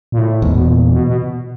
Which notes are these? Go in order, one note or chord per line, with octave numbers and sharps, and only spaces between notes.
A#2
A2
E2 G#2
B2
A#2
B2
B2